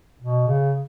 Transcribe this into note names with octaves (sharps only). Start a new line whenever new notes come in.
B2
C#3